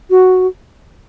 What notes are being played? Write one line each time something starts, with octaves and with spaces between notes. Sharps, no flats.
F#4